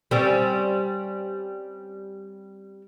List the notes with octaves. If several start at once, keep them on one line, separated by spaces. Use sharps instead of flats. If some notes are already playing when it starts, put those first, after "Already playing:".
G3 C4 C#4